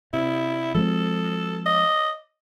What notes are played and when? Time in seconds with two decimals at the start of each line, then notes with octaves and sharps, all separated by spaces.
0.13 C3 E4
0.75 F3 G#3 C4 A4
1.66 D#5